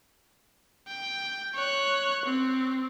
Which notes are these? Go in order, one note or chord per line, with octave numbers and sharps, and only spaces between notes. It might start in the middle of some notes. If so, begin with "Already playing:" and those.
G5
C#5 F#6
C4